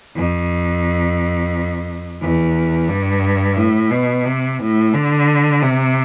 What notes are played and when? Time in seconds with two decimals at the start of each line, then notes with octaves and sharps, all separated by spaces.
0.16 F2
2.21 E2
2.89 G2
3.57 A2
3.91 B2
4.26 C3
4.60 A2
4.94 D3
5.62 C3